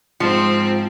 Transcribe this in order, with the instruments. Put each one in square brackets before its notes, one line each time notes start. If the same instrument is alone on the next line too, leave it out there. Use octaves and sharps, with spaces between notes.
[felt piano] G#2 C#7 [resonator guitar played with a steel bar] F3 [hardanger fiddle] C4